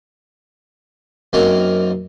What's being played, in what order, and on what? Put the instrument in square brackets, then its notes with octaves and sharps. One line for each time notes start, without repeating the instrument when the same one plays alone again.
[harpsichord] F#2 A#3 C4 D#4 A#4